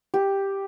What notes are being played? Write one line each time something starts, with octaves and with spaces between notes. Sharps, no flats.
G4